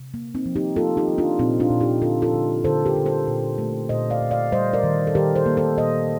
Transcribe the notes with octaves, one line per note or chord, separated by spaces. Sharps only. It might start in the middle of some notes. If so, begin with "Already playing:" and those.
Already playing: C3
A#3
C4 D#4
F3
D#4 G4
A#3 F4 A4
D#4 G4
F3
D4 F4
A#2 C4 D#4
D4 F4
A#2
D#4 G4
D3 F4 A4
F4 A4
D3
D3 A4 C5
G4 A#4
D3
A4 C5
A#2
A3
A#2 C5 D#5
D5 F5
A#2
D5 F5
G3 C5 D#5
A#4 D5
D#3
A4
D#3 G4 A#4
A4 C5
A#3
A4 C5
A#2 C5 D#5